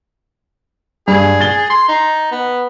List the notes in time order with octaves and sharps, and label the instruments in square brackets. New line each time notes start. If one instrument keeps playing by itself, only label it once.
[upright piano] G2 [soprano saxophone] G#4
[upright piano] A6 G7
[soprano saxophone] C6
D#4
B3